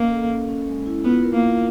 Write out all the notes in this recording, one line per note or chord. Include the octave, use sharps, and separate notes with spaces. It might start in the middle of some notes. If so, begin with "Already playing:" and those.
Already playing: A#3 C#4 D#5
A4
C#4
C#4
G#3
E4
B3 F4
A#4
A#3
F4